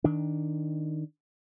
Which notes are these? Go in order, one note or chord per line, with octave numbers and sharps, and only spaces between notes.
D#3 D4